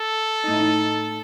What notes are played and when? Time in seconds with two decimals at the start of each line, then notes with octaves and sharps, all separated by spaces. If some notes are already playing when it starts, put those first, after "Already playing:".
Already playing: A4
0.45 A2 A3 D#4